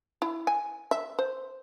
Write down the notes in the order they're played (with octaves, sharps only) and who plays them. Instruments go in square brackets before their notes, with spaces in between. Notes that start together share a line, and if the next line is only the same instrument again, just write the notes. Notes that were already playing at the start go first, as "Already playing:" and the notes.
[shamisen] E4
G#5
E5
C5